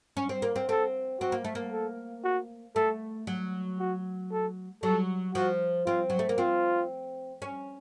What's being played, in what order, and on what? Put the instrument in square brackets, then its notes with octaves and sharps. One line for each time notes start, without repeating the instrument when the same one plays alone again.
[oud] C#4
C4
A#3
C4
[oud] C4 [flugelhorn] A4
[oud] C4 [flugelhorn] F#4
[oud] A#3
A3
A#3
[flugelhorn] A4
F#4
[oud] A3 [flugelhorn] A4
[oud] F#3
[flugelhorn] F#4
A4
[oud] F#3 [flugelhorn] A4
[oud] F3 [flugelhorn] F#4
[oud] C4 [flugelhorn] F4
[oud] F#3
A3
A#3
[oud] C4 [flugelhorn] F4
[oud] C#4